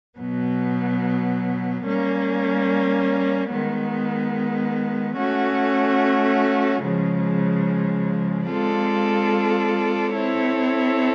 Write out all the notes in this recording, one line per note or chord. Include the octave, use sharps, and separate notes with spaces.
B2 F#3 B3
G3 A#3 C#4
D#3 G#3 B3
A3 C#4 F#4
C#3 F3 G#3
G#3 C4 F4 A4 D5
C4 E4 A4 C#5